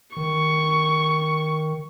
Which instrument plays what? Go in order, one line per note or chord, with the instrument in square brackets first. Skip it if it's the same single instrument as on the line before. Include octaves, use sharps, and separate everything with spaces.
[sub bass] D#3 [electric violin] C#6